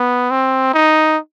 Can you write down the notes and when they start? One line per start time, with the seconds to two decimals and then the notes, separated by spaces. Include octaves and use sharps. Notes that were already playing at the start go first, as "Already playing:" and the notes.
Already playing: B3
0.30 C4
0.73 D#4